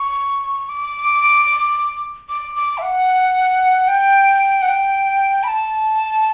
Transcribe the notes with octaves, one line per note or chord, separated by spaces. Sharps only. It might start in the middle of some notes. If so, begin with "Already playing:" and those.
Already playing: C#6
D6
D6
D6
E5
F#5
G5
F#5
G5
B5
A5